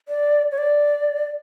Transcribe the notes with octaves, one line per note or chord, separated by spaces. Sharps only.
D5
C#5
D5